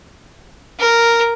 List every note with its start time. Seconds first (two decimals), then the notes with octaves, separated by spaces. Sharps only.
0.79 A#4